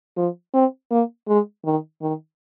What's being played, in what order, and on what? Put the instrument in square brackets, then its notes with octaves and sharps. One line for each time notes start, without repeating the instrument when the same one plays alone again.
[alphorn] F3
C4
A#3
G#3
D#3
D#3